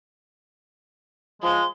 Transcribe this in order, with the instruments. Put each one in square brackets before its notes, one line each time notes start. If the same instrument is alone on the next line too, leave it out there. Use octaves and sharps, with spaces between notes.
[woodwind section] F3 G#3 [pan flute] C6